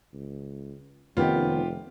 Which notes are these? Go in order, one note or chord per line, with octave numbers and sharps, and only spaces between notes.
C#2
F1 D#3 B3 C#4 F4 G4